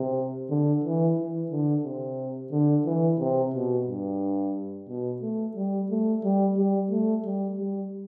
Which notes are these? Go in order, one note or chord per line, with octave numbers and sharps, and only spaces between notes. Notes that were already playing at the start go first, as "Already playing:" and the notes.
Already playing: C3
D3
E3
E3
D3
C3
D3
E3
C3
B2
G2
B2
A3
G3
A3
G3
G3
A3
G3
G3